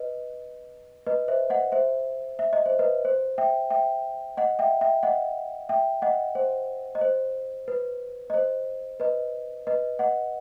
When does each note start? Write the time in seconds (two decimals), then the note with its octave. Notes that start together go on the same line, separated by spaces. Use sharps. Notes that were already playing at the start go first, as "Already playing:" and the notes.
Already playing: B4 D#5
1.07 B4 D#5
1.28 C5 E5
1.50 D#5 F#5
1.72 C5 E5
2.39 E5
2.53 D#5
2.66 C5
2.79 B4 D#5
3.05 C5
3.38 E5 G5
3.70 E5 G5
4.37 D#5 F#5
4.59 E5 G5
4.81 E5 G5
5.03 D#5 F#5
5.69 E5 G5
6.02 D#5 F#5
6.35 C5
6.95 D#5
7.01 C5
7.68 B4
8.30 D#5
8.34 C5
9.00 B4 D#5
9.67 B4 D#5
9.99 D#5 F#5